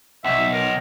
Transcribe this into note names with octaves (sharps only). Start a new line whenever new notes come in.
B1 E5
A#4